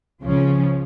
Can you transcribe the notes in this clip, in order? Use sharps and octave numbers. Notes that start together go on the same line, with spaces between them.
C#2 C#3 F3 C#4